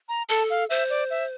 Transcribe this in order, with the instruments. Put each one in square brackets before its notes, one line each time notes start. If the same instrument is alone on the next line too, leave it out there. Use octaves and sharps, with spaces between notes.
[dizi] A#5
[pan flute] A4 [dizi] A5
[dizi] F5
[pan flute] C5 [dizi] E5
[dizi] D5
E5